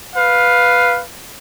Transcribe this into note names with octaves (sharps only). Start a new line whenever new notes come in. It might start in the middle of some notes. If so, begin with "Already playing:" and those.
B4 F5